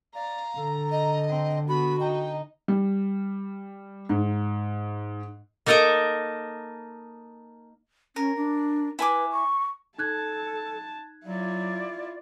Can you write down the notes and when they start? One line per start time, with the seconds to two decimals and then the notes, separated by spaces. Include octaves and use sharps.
0.15 D5 F5 A#5
0.58 D3 A4
0.91 D#5 A#5
1.29 C4
1.69 B3 F#4 B5
2.00 D#4 G5
2.68 G3
4.09 G#2
5.66 A#3 D#4 A4 A#4 D#5 A#5
8.16 C#4 A#4
8.36 D4
8.99 E4 B4 G#5 D6
9.32 C#6
9.98 D#4 A4 A5 F#6 G#6
11.26 F#3 E4 F4 D5